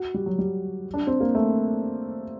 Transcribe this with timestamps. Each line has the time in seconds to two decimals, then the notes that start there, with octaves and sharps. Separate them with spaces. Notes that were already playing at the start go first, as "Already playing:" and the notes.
Already playing: F#4
0.14 G3
0.26 F#3
0.39 G3
0.94 D4
1.07 C4
1.20 A#3
1.35 A3